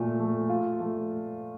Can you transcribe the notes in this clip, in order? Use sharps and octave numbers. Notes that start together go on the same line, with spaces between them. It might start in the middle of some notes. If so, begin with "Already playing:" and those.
Already playing: A#2 A3
A3
F4
A3